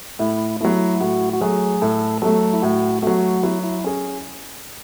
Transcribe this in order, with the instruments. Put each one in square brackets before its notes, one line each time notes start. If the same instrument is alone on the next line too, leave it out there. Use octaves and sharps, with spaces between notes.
[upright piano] A2 [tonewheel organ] E4
[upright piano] F#3 A3 [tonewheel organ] E4
[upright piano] A2 [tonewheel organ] F#4
[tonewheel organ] F#4
[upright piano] F#3 A3 [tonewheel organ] G#4
[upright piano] A2 [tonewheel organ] A4
[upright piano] F#3 A3 [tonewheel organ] A4
[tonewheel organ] E4
[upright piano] A2 [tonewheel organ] F#4
[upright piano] F#3 A3 [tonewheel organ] F#4
[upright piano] F#3 [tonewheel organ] E4
[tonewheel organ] E4
[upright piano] C#4 G#4